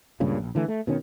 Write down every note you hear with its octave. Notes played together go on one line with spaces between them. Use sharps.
C#2 G2 A#2 C#3
A#1
D3 E3 A3
A3
B2 D#3 C#4